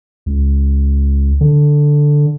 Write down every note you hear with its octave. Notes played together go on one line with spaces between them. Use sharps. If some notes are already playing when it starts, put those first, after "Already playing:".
C#2
D3